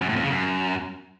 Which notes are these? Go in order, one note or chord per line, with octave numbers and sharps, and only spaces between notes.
F#2
A2
F2
C#3
F#2